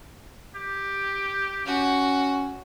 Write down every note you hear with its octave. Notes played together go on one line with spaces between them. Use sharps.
G4
C#4 F#4